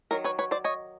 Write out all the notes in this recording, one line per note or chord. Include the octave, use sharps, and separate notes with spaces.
D#3 F#3 A#4
B4 C#5
B4 C#5
C5 D5
C#5 D#5